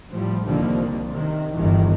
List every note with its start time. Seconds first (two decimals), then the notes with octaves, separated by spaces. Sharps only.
0.11 A2 F3 G3
0.43 C2 D3 D#3 F3 G3 A#3
1.11 C3 D#3
1.54 G1 E2 D#3 E3